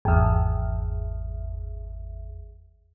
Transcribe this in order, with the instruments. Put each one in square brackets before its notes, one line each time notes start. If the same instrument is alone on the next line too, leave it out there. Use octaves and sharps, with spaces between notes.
[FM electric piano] G#1 E2